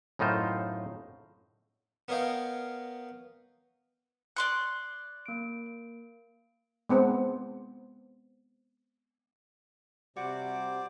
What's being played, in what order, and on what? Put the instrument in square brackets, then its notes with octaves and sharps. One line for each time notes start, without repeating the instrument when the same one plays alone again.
[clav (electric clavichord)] F#2 A2 D#4 F4 C5
[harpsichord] B3 A#4 C#5 D#5 F5 G5
[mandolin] D5 C6 C#6 [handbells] F#6
[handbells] A#3 D7
[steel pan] G#3 B3 C4
[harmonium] C3 [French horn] G3 [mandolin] F#4 [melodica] C5 D5 D6